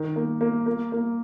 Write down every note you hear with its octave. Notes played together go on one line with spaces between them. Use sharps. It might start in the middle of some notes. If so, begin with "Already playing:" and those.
Already playing: D#3
A#3
A#3
A#3
A#3